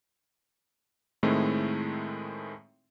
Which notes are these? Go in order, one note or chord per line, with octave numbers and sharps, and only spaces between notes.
A2 D#3 G#3 A3 C4 E4